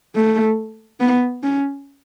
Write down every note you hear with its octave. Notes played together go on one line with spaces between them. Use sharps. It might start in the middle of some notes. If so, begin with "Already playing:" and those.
A3
B3
C#4